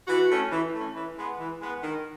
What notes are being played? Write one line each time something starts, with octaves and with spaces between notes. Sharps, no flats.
E3 F#4
A3 C#4
E3
A3 C#4
E3
G#3 B3
E3
G#3 B3
D#3